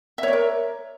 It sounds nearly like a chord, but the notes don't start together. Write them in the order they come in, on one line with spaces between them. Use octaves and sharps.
E5 C#5 D5 A#4